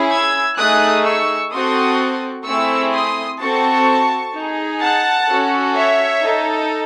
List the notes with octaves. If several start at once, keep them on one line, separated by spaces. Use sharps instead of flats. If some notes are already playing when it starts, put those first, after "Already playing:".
Already playing: C#4 E4 G#4
E6 G#6
A3 D#4 G#4 D#6 F#6
C#6 E6
C4 F#4 A4 C6 D#6
A3 C4 E4 G#4 C#6 E6
C6 D#6
C4 F#4 A4 A5 C#6
D#4 G#4
F#5 A5
C#4 F#4 A4
C#5 E5
D#4 A4